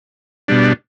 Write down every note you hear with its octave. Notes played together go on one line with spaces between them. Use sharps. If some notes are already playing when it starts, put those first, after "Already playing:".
B2 G3 D4